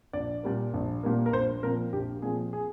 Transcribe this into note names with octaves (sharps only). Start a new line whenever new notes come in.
A#1 D5
A#2 G3 A#3
A#1
A#2 G3 A#3
A#4
A#1 C5
A#2 F3 C4 A#4
A#1 G4
A#2 F3 C4 G#4
G#4